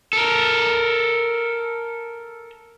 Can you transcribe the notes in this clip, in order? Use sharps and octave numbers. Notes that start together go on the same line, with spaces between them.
A4 A#4